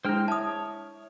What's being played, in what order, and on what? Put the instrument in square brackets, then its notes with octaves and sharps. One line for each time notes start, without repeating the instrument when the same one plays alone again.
[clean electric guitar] G#3 G#4 [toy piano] D4 E4 [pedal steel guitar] C5 G5 F6
[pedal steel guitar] C#5 [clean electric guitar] E5 [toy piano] A5 D#6